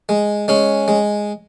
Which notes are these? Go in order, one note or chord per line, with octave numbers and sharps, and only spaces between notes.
G#3
G#3 C#4
G#3